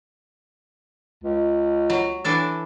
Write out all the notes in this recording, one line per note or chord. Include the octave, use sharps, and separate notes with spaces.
C#2
F#3
E3 D4 A4